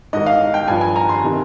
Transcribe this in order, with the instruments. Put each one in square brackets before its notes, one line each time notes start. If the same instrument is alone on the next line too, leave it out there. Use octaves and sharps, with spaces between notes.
[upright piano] G#2 D#3 D#5
F5
G5
G2 F3 G#5
G#5
A#5
C6
C3 D#3